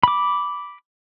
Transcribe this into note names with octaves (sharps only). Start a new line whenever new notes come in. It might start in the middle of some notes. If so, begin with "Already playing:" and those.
B5 D6